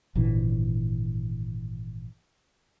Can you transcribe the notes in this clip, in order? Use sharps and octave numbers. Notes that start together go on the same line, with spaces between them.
G#1 A#2 D3 E3